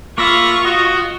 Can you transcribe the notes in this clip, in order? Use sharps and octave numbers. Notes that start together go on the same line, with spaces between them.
A#3 F4 E5 F5 B5 C#6 A#6
F#4 D#5